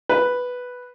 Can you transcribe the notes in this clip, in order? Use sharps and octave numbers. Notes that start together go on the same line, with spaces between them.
B4